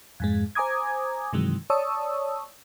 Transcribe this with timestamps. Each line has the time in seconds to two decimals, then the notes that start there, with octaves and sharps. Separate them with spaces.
0.20 F2 G#2 G#3
0.55 C5 G#5 A#5 D6 D#6 G#6
1.33 G2 C3 D#3 E3 F#3 G#3
1.70 C#5 D5 A5 C#6 D#6 E6